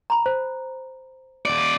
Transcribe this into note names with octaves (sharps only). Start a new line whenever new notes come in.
A#5 B5
C5
D#2 D5